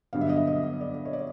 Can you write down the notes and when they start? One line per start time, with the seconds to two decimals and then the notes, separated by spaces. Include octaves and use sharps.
0.13 G2 D3 F#3 B3 F5
0.21 E5
0.29 D#5
0.36 E5
0.47 D#5
0.81 D5
1.05 C#5
1.13 D5